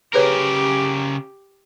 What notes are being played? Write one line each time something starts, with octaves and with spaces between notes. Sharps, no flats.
C#3 G4 G#4 A#4 B4 C#5